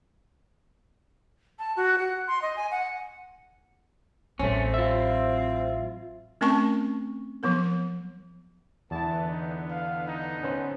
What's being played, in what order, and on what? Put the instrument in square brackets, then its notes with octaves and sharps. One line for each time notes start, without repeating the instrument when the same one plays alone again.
[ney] A5
F#4
F#5
C6
D#5
G#5
F#5
[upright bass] A1 F#3 [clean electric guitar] A3 C#4 [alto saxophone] C4
[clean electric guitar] F4 E5
[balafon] A3 C4 C#4 A#4 A5 C#6
F3 F#3 B3 A#4
[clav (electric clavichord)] E2 E4 [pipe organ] D3 B3 [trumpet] A5
[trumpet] D#4
F5
D#4
[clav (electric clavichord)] C#4 B4 C5